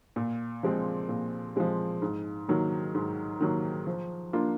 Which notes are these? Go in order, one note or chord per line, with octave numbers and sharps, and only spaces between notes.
A#2
F3 G#3 C4
A#2
F3 G#3 C4
G#2
D#3 F#3 A#3
G#2
D#3 F#3 A#3
F3
A#3 D4 F4